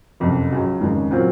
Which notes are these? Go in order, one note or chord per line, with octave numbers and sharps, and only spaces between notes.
F#1 F2 C3
C#2 C#3 F#3
F1 D#2 C#3 G#3
A#2 F#3 C4 F4